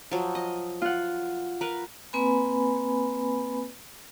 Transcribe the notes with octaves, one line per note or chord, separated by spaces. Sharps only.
F3 F#3
D#5
F4 F#5
A#4 B4
A#3 C4 B4 G#5 B5